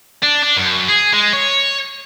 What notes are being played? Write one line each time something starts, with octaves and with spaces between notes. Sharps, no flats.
D4
D4
F#2
G#4
G#3
C#5